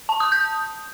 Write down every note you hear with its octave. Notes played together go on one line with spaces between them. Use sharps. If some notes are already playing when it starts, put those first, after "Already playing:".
A5
D#6
G6